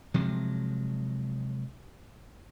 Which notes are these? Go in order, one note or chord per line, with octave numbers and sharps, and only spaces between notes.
C3 F3 F#3 G#3